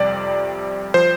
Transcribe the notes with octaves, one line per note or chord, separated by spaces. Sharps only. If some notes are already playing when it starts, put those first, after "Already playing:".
Already playing: F2 C3 G3 D5
F3 C5